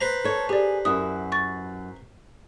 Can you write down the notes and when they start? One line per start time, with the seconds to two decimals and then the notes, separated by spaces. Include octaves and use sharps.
0.01 B4 C5 A#5
0.24 A4 C#5
0.49 G4 G#4 D5
0.85 F#2 E4 F#4 D#6
1.32 C#6 A6